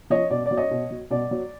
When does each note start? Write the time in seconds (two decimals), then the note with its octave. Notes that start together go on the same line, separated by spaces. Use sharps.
0.10 F3 C#5 D#5
0.30 B2 D5
0.46 D5
0.51 F#3
0.57 C#5 D#5
0.71 B2
0.91 F#3
1.10 B2 D5
1.31 F#3